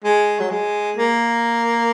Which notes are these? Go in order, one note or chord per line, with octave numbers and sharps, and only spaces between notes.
G#3
F#3
G#3
A#3